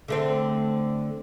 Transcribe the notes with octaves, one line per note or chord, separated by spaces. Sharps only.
D3 A3 C4